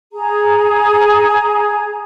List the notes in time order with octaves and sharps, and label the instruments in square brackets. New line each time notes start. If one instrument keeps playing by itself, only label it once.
[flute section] G#4 A#5